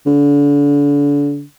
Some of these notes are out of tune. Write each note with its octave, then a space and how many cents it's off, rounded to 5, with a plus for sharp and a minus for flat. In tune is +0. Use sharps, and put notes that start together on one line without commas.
D3 -35